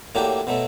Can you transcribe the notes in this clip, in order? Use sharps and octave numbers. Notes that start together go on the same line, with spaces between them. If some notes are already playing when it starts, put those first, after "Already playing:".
A2 F#3 A#3 D4 G4
B2 F#3 A3